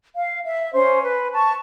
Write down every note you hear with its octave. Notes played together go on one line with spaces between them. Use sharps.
F5
E5
C#4 C5
B4
A5 C#6